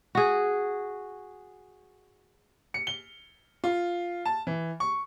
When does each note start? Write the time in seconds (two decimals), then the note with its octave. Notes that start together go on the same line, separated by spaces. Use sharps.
0.15 F#4 G#4
2.74 C#7
2.87 G7
3.64 F4
4.25 A5
4.47 E3
4.80 C#6